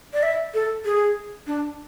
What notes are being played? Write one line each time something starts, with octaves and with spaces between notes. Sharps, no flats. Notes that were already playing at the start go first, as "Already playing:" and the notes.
D5
E5
A4
G#4
D4